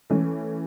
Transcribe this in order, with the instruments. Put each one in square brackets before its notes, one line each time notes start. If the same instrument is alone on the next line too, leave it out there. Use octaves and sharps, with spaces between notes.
[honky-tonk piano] E3 A3 C#4